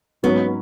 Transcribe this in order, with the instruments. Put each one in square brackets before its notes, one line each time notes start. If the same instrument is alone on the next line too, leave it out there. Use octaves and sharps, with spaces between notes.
[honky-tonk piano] G#2 F#3 C#4 F#4 [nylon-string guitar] B3